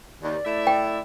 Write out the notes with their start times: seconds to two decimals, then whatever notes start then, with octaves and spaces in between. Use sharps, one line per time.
0.23 D#2 D5
0.45 A3 E4 E5
0.67 G5